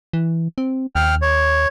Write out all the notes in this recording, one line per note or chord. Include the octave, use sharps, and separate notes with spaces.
E3
C4
D#2 G5 F6
C#5